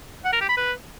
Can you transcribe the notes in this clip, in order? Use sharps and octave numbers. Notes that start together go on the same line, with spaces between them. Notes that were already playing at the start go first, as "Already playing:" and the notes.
F#5
A#4
G4
B5
B4